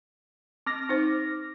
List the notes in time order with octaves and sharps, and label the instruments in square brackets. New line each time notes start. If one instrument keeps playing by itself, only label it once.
[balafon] C4 [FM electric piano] D6 F6 A#6
[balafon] D#4 C5